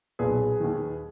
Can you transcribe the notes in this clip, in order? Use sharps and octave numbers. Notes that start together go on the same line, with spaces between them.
B1 A#2 G#4 B4
D#2 D#3